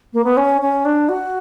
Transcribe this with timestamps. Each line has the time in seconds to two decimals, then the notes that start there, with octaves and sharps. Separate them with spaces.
0.13 A#3
0.24 B3
0.37 C#4
0.61 C#4
0.85 D4
1.09 F#4